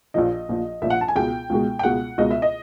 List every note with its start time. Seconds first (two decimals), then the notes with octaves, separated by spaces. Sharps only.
0.14 A#1 A#2 F3 D#5
0.49 A#1 A#2 F3
0.82 A#1 A#2 F3 E5
0.90 F#5
1.01 A5
1.08 G#5
1.16 C#2 B2 G#3 G5
1.50 C#2 B2 G#3
1.79 G5
1.83 C#2 B2 G#3 F#5
2.18 C#2 B2 G#3 D#5
2.31 E5
2.42 D#5